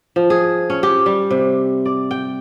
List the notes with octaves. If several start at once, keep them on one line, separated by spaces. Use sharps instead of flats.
F3
G#4
C#4
G4
G3
C3
D5
G5